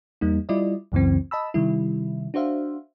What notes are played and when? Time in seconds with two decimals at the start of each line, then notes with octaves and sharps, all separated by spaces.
0.21 E2 G3 A#3 D#4
0.49 G3 E4 F4 D5 D#5
0.92 C#2 F#2 C#3 E3 C4
1.31 D#5 A5 B5 E6
1.54 C3 D#3 G3 E4
2.34 D4 F#4 C5 E5 F5